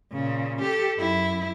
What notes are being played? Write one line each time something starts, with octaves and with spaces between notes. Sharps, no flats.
A#2 C#3
G4 A4
F#2 E4